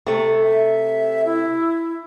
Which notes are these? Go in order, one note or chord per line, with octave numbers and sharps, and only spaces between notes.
C3 A3
E5
E4